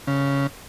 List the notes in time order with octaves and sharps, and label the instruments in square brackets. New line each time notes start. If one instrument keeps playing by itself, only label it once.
[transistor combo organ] C#3